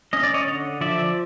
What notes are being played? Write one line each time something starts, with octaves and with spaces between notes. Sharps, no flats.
C#4 D#5
D5
C#5 D#5
D3
F3 D5 E5